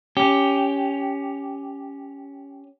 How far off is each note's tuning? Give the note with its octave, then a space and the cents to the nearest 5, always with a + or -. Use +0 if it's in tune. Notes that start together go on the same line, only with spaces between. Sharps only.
C#4 +10 G4 +0